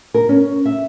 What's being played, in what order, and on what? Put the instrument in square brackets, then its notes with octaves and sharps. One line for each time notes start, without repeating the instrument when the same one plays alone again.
[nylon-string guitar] A#4
C#4
E5